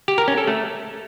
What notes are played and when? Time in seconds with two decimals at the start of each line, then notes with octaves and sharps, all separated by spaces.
0.08 G4
0.18 A#4
0.28 C#4
0.38 A4
0.47 A3